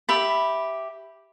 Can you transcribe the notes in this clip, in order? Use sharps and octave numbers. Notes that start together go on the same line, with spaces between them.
G4 E5 B5